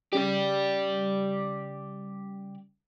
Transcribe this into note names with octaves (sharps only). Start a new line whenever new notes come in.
C#3 G3 G4 D5